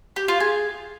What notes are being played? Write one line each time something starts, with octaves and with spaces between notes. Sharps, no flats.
G4
F4
G#4